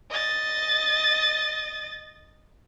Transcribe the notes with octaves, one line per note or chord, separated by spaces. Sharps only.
D#5 A6